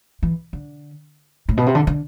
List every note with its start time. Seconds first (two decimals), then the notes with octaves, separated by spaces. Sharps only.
0.23 E3
0.53 D3
1.49 A2
1.57 B2
1.66 C3
1.75 D3
1.87 D3